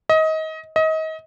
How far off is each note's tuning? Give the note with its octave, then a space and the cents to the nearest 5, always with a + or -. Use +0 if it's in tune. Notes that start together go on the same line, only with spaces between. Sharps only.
D#5 +25
D#5 +30